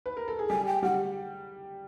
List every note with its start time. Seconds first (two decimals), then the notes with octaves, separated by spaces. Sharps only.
0.06 B4
0.17 A#4
0.28 A4
0.39 G#4
0.50 G3 G4 G#5
0.67 G5
0.83 G3 G4 F#5